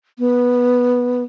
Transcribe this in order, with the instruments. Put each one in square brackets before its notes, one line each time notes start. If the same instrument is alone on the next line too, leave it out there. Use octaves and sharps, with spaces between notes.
[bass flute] B3